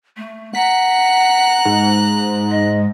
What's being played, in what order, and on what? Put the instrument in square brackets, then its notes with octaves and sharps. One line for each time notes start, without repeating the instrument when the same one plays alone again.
[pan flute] A3
[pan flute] F#5 [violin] A#5 F#6 [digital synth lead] B6
[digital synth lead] G#2
[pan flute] D#5